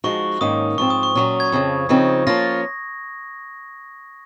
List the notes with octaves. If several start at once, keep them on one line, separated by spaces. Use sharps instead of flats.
F3 G#3 D#4 F#4 C#6
G#2 D#3 A#3 C#4 D#6
G#2 F3 C4 C#6
D#6
C#6
A#2 F#3 C#4
G#6
F2 C#3 F3
C#3 F3 C4 D#4
F3 A#3 C#4 F4 A#6